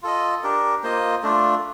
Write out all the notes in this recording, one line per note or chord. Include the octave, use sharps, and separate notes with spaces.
F4 A4 D#5
D4 G4 A#4
A#3 F4 C5 D#5
A3 D4 F4